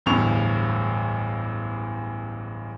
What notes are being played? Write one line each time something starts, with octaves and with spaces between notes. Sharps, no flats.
D1 A1 E2 G2 C#6 F7